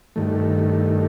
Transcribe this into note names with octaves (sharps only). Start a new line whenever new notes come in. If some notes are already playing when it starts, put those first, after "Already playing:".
G2 D#3 A3